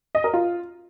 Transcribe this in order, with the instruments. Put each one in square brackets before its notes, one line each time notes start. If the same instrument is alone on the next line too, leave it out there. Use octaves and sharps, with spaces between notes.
[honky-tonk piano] D#5
A#4
F4